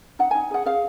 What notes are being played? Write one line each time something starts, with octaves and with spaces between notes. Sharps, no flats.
D#4 F#5
G#5
D#4
G#4 F#5
G#4 F5